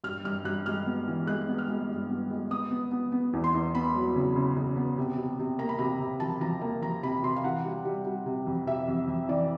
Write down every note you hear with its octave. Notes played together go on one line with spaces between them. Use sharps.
G2 F6
G2 F6
G2 F#6
G#3 F6
B3
E3
G#3 F#6
B3
F6
G#3
G2
B3
G#3
B3 D#6
B3
B3
B3
E2
C6
E2
B3 B5
F#3
C#3
C#3
C#3
B3
C3
C3
C3
A#3 A#5
B5
C3 A#5
C3
F3 A5
F3 A#5
A#3 A#5
F3 A#5
C3 B5
C3 C6
F5
E3 F#5
G3
G3
G3
C3
F2
C3 E5
F2
F2
E3 D5